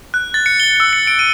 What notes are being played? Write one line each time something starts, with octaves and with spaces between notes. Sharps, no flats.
F#6
A6
C#7
G7
E6
C#7
D7
D#7